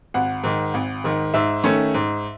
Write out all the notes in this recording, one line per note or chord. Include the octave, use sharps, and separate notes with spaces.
G#1 F#5
G#2 D#3
G#1
G#2 D#3
G#2 E5
D#3 A3 C#4
G#2